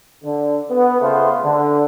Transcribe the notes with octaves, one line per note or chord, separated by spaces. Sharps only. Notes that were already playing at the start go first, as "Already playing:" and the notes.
D3
B3
C#3 A3 B3 F4 C5
D3